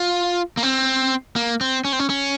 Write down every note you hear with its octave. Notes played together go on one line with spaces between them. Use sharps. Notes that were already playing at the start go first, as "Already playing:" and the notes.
Already playing: F4
A#3
C4
A#3
C4
C#4
C4
C#4
C#4